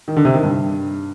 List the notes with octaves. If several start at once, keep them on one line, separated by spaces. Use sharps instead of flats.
D#3
D3
C3
D#3
G2